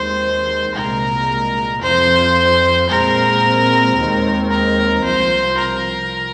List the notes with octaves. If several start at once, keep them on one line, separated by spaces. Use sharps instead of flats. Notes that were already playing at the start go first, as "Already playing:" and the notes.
Already playing: D#2 D#3 G#3 C4 C5
C2 A#2 G#3 A#4
F2 F3 C4 C5
A#2 G#3 C4 A#4
D#2 D#3 G#3 C4
A#4
C2 C3 F3 C5
A#4